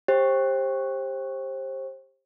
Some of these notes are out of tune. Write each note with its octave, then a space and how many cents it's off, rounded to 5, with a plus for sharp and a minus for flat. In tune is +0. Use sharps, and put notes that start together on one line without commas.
G4 +15 C5 +30